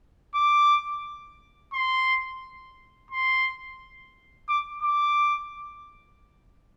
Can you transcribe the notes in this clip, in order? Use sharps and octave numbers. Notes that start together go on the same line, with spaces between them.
D6
C6
C6
D6
D6